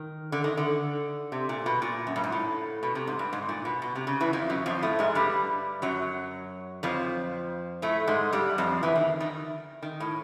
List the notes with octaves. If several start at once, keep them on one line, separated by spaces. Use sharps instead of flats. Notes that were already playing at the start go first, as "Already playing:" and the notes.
Already playing: D#3
D3
D#3
D3
C3
A#2
B2
A#2
F#2
G2
G#2
A2
B2
C3
G#2
G2
G#2
A#2
B2
B2
C3
C#3
E2 E3
F2 F3
F#2 F#3
F2 F3
A2 A3
G#2 G#3
G2 G3
F#2 F#3
F2 F3
A2 A3
G#2 G#3
G2 G3
F2 F3
E2 E3
D#3
D#3
D#3
A2